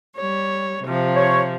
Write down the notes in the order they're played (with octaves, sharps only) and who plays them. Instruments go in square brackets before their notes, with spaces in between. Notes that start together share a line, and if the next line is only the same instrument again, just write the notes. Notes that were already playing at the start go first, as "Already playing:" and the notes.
[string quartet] G3 C#5
C3 F3
[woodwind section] C#5